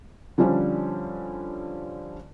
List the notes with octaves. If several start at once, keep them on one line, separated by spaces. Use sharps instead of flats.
D3 F3 G3 C#4 D4 C5